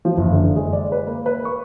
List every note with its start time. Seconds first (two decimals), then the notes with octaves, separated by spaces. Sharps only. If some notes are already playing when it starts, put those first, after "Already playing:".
0.05 F3
0.17 F#1
0.32 D3
0.56 G#3
0.73 D5
0.92 B4
1.07 A#3
1.26 B4
1.45 C#6